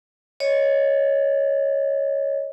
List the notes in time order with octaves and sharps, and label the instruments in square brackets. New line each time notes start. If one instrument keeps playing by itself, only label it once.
[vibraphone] C#5 D#5